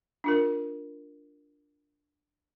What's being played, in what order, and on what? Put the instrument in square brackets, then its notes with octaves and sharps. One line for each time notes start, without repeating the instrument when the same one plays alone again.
[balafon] D4 F4 A#4